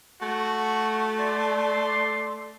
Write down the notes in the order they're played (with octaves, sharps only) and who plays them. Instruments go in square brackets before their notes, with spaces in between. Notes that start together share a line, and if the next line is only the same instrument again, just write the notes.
[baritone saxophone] A3 [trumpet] F#4
[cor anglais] D5 [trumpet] C6